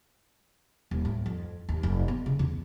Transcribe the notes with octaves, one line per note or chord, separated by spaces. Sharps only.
D#1
A2
F2
D#2
F1
B3
C#3
E2